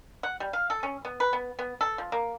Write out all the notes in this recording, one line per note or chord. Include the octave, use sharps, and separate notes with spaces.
F#5
G3
F5
A4
C#4
B3
B4
B3
B3
A4
F3
A#3